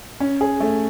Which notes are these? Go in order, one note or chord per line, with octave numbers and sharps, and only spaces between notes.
C#4
G#4
A3